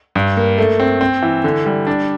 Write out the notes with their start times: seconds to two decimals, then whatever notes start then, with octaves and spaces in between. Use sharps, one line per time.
0.15 G2
0.37 A#3
0.58 A3
0.80 C4
1.01 C4
1.22 E3
1.44 D3
1.66 G3
1.87 D4